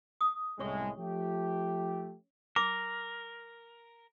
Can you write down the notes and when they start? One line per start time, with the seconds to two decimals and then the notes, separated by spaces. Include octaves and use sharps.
0.21 D#6
0.59 C2 A2 G#3 C#4 C#5 C#6
0.98 F3 A3 G4
2.56 A#4 D6